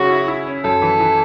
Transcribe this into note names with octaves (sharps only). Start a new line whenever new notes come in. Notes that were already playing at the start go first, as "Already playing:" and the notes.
Already playing: C#3 F#3 C#4 F#4
E4
E4
C#4
F#2 A4
E3
E3